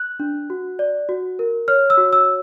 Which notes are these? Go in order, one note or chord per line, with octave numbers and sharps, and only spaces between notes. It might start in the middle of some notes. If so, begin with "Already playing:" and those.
Already playing: F#6
D4
F#4
D5
F#4
A#4
C#5 F6
E6
F#4
E6